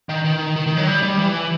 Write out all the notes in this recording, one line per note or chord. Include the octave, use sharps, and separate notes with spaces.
D#3
D#3
D#3
D#3
F#3
G3
G3
E3